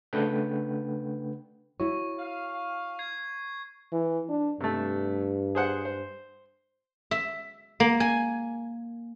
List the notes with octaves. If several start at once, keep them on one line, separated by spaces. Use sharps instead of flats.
C#3 A3 D4 B4 F#5 G5
E4 F#4 C#5 C#6
F5
G#6 C7
E3
D4
G2 C3 A3
G#4 C5 F#5
C5
E5
A#3
G#5